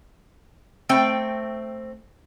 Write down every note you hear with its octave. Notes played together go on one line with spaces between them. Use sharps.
A3 C4 G5